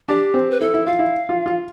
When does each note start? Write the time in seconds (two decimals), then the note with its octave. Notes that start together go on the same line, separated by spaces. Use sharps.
0.08 D4 G4
0.34 C4
0.51 B4
0.60 E4 A4
0.74 E4
0.86 F4 F5
0.99 E4
1.29 F4
1.46 F4